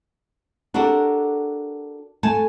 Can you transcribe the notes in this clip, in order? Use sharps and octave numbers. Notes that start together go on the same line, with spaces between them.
D4 F#4 G4 A4 A#4
A3 G#5 A5